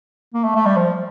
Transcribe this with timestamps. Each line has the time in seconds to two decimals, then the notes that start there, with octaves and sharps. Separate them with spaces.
0.34 A#3
0.44 A3
0.55 A3
0.66 G3
0.76 F3